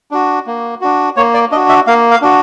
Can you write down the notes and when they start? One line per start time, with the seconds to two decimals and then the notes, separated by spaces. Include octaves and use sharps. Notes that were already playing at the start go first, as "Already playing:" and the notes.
0.11 D4 F#4
0.47 A#3
0.81 D4 F#4
1.17 A#3 C#5
1.34 D5
1.51 D4 D#5
1.56 F#4
1.69 E5
1.87 A#3 F5
2.11 F5
2.22 D4 F#4